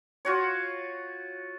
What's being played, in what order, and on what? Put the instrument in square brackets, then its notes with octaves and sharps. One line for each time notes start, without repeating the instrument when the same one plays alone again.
[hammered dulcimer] F4 F#4 C#5